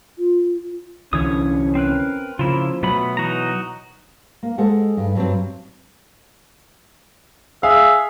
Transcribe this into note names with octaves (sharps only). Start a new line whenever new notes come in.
F4
C2 D3 E3 C#4 C#5 D#6
C4 A#4 B4
C#3 F3 A#3 E4 F4
B2 F#3 A3 B3 B5
E3 D#4 F#4 A#5
A#3
G#3 A4 C5 F#5
G2
G2 F#3 C4
G#4 E5 F5